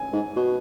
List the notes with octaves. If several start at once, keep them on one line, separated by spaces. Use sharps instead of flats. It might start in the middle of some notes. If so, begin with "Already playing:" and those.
Already playing: G#5
G#2
B2